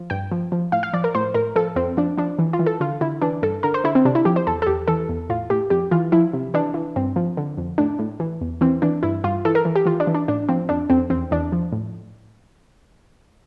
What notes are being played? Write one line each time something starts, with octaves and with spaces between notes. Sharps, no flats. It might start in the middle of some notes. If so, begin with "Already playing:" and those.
Already playing: F3
G2 G5
F3
F3
A2 F5
F5
F3 D5
A#4
A2 C5
A2 A#4
F3 A4
F2 C4
F3 D4
F3 D4
E3
F4
E3
A4
D3 F4
D3 E4
E3 D4
G2 A4
D3 A#4
C5
D3 E4
C4
C3 D4
E4
F3 G4
C5
E2 A4
A4
E2 G4
E3 A4
E2
A2 F4
A2 G4
F2 G4
E3 F4
F3 E4
C3
E3 D4
E3
G2 C4
F3
D3
F2
A2 D4
A2
E3
E2
E3 C4
E3 D4
G2 E4
G2 F4
E3 A4
A#4
E3
G4
E3 F4
D4
E3
D4
A2 D4
F3 C4
F2 D4
F2 C4
E2 C4
E2 D4
F3
A2